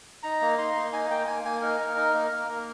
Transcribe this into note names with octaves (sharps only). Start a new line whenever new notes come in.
D#4 A#5
A#3
D#4 C6
A#3
D#4 G#5
A#3 G5
A#3 G#5
A#3 G#5
D#4 A#4
D#4
D#4
A#3
A#3
A#3